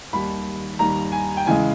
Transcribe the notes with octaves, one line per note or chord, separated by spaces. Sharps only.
D#2 D#3 G3 B5
D#2 D#3 G3 A#5
G#5
G5
E2 C#3 E3 G#3 G#5